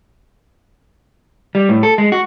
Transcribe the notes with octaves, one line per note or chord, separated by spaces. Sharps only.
G3
A2
A4
G#3
F#4